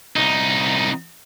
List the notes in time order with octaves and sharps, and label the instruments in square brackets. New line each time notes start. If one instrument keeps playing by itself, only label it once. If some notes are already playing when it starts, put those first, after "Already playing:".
[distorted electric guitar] C2 D#4